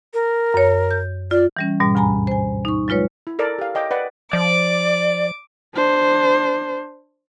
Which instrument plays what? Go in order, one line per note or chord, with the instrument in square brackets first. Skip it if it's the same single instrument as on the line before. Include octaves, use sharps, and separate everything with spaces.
[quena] A#4
[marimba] F#2 C#5
G6
[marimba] F4 [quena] D5
[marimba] E3 G3 C#4
G#2 B2 G3
D2 G2 G#5 A#5 B5
C5 G#5
D#4 C#6
F#3 G#3 F4 B4 C#5
[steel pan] E4
A4 A#4 D5
G4 F5
C#5 D#5 G5 D6
B4 D5 F#5
[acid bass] F3 [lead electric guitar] D5 [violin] D6
[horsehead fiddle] D4 C5